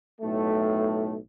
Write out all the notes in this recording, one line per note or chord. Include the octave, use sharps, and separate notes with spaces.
B1 A2 A3